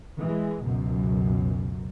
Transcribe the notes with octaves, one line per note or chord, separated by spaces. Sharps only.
E3 G#3
C#2 F#2 B2